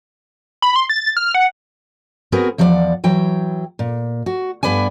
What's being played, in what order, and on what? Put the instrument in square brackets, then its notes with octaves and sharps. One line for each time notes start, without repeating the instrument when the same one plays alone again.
[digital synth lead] B5
C6
A6
F6
F#5
[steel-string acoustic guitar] B3 C4 F#4 G#4 A#4 B4
E2 F3 A4 C#5 D5 F#5
E3 F#3 G5
A#2
F#4
G2 B3 B4 D5 G#5